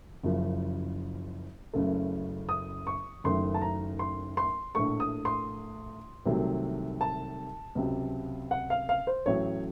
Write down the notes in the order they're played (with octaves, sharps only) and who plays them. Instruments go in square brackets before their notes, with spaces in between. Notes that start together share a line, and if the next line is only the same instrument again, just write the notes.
[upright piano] F#1 F#2 C#3 F3
F#1 F#2 C#3 A3
D#6
C#6
F#1 F#2 D#3 A3 C6
A5
A#5
C6
C6
A#1 A2 A3 C#6
D#6
C6
C2 C3 D#3 F#3 A3
A5
C#2 C3 F#3
F#5
F5
F5
C5
A1 A2 F#3 A3 C#5